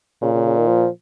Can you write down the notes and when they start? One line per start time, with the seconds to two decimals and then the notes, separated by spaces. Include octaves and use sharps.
0.22 A#2 C#3
0.34 C#3
0.46 C#3
0.57 D#3
0.68 F3